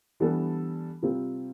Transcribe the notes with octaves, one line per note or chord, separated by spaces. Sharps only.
E3 G3 B3 D4 A4
C3 G3 C4 F4